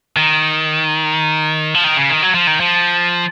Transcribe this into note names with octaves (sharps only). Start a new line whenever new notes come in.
D#3
F3
D#3
C#3
D#3
F#3
F3
D#3
F3